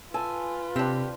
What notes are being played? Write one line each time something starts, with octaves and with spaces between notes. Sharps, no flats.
F4 A4 B4 G#5
C3 C4 D4 G4